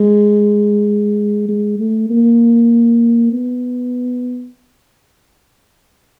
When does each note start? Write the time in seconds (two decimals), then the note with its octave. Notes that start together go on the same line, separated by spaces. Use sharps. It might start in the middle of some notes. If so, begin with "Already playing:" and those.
Already playing: G#3
1.48 G#3
1.79 A3
2.10 A#3
3.32 B3